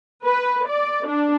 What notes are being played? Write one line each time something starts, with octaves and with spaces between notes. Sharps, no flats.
B4
D5
D4